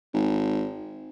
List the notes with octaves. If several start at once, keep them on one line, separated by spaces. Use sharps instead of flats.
G#1